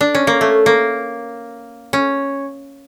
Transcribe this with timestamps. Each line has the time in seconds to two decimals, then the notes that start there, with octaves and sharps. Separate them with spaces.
0.01 D4
0.15 C#4
0.27 A#3
0.41 A3
0.66 A#3
1.93 C#4